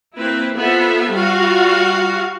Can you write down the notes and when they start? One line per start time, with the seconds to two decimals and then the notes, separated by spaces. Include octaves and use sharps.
0.16 A#3 C4 E4 B4
0.57 B3 F4 A4 C5 E5
1.13 G3 F4 F#4 F5